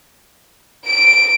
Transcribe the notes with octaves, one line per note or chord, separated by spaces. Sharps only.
D7